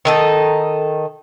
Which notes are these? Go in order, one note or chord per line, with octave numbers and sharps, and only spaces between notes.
D#3 D#4 A4